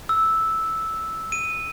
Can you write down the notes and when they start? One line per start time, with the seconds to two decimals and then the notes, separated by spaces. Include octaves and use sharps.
0.09 E6
1.32 D#7